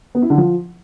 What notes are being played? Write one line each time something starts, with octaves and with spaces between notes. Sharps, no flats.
B3
E4
D3
F3